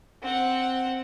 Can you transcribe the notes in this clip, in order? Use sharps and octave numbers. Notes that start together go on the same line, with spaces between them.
C4 F#5